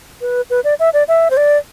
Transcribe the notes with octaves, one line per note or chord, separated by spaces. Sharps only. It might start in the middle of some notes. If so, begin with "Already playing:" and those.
B4
B4
D5
E5
D5
E5
C5
D5